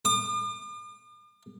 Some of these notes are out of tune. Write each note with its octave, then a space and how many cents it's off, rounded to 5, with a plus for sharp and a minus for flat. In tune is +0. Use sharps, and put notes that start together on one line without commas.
D6 +45